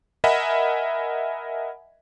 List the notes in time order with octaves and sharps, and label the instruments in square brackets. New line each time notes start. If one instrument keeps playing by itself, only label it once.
[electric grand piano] A#4 D#5 E5 F#5 G#5 B5